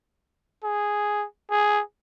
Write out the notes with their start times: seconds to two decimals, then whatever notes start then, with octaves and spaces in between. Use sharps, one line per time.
0.64 G#4
1.51 G#4